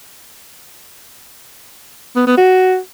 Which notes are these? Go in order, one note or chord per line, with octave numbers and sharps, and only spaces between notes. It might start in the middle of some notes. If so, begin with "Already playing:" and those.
B3
B3
F#4